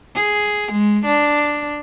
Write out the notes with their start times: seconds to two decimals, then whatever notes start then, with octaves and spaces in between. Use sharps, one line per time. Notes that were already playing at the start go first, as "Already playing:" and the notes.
0.15 G#4
0.72 G#3
1.05 D4